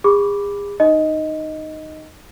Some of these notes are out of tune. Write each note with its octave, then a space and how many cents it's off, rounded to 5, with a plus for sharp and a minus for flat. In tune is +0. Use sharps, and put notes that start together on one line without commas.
G#4 -40 B5 +0 D6 +0
D#4 -15 D#5 +5